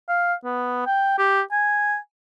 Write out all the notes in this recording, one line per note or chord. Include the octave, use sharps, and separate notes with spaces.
F5
B3
G5
G4
G#5